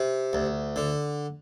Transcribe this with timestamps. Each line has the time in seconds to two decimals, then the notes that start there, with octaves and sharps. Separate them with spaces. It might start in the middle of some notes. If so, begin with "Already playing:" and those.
Already playing: C3
0.33 D2
0.76 D3